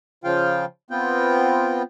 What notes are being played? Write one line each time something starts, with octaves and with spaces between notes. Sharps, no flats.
C#3 F3 F4 F5 G5
B3 C4 F4 G5